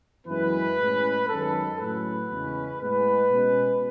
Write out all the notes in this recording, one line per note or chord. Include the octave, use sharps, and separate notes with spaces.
F#2 E3 G#3 B3 B4
A2 G#3 C#4
F#2 D#3 G#3 C#4 A4
A2 F#3 C#4 B4
E2 C#3 G#3 C#4
A2 G#3 B3 B4
B2 G#3 C#4